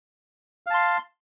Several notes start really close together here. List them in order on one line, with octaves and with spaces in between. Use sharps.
F5 A5 C6